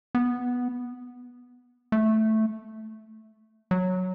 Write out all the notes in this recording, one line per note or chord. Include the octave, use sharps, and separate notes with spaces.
B3
A3
F#3